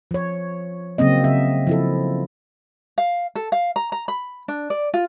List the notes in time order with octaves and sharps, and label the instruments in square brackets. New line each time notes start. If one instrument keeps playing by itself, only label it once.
[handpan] F3 C#5
C#3 F#3 A#3 C4 D#5
C#3 E5
F3 E4 A4
[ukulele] F5
A4
F5
A#5
A#5
B5
D4
D5
F4